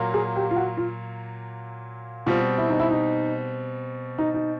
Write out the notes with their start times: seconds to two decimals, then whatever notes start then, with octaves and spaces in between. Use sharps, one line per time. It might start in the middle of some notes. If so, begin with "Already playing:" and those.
Already playing: A#2 F#3 A#3
0.14 G#4
0.36 G4
0.51 F4
0.56 F#4
0.77 F4
2.26 B2 G3 C4 F4
2.58 E4
2.70 D#4
2.80 E4
2.91 D#4
4.18 D#4
4.34 D#4